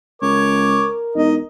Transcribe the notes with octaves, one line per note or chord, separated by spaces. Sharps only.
C#2 A#4 C#5 D6
E1 D#4 D#5